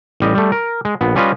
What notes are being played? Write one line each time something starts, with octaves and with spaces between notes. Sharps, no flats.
A1 G3 D#5
G3 A3
A#4
G#3
A#1 B3
G3 C#4 F4 B4 D#5